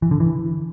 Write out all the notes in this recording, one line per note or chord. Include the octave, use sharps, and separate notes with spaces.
E3
D3
E3